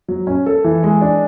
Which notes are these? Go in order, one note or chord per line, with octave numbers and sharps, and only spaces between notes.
F#3
C#4
A4
E3
G#3
D4